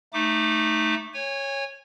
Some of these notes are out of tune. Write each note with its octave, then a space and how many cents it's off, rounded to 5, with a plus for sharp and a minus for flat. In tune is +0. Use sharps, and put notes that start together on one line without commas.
A3 +0 D#4 +0 D6 +15
C#5 -10 G#5 -30